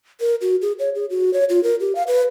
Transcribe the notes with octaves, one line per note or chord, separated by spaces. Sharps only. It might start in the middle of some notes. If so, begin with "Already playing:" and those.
A#4
F#4
G#4
C#5
G#4
F#4
C#5
F4
A#4
G4
F5
B4